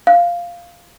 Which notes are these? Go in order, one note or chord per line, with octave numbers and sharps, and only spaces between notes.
F5